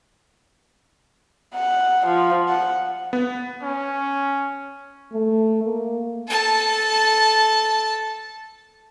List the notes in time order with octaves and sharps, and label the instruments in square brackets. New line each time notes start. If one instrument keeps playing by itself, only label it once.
[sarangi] F#5
F3
F#5
[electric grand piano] B3
[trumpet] C#4
[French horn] A3
A#3
[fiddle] A4 A5